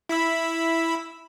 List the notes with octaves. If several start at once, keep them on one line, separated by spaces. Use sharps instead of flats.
E4 B5 E6